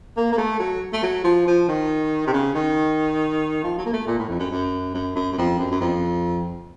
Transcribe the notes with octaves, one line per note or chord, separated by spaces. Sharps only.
A#3
A#3
A3
F#3
A3
F#3
F3
F3
D#3
C3
C#3
D#3
F3
F#3
A#3
A3
A#2
A2
F2
F#2
F#2
F#2
F#2
F#2
F2
F#2
F#2
F2